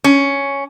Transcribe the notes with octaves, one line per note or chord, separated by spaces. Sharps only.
C#4